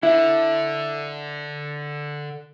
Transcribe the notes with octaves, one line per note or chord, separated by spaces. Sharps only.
D3 E4